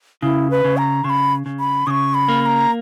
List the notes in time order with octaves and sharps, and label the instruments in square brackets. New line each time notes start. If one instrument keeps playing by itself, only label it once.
[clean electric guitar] C#3 [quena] E4
[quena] B4
[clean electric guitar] C#3
[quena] A#5
[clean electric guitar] C#3 [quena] C#6
[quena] B5
[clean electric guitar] C#3
[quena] B5
[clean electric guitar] C#3 [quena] D#6
[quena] C#6
B5
[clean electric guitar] A#3
[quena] B5
A#5